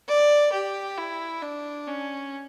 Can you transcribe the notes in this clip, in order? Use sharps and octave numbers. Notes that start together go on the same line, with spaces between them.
D5
G4
E4
D4
C#4